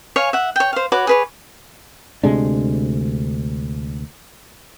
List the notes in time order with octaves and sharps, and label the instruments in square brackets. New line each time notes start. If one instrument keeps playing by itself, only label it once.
[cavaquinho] C#5 F5 G#5
E5 F#5
C#5 G5
C5 F5
F#4 B4 C#5 D6
G#4 B4 C#5
[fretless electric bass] D2 C3 G#3 D4